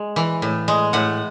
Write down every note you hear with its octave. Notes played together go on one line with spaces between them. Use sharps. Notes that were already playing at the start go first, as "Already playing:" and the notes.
Already playing: G#3
E3
A2
G#3
A2 F#5